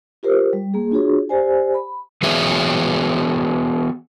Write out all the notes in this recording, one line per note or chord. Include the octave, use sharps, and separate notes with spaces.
F4 G4 A#4 C5
G3
A#3 G#4
D4 F4 F#4 G#4 C#5
G4 C5 D5 G#5
B5
E3 B3 F#4 G#4 C#5 E5